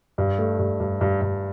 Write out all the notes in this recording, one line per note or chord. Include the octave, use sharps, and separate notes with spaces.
G2
A3
G2
G2
G2
G2